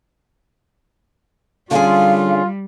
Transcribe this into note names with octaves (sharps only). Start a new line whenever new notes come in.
D3 G3 C#4 F4 G#4 F5